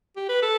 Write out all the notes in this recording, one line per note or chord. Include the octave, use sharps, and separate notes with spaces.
G4
B4
A4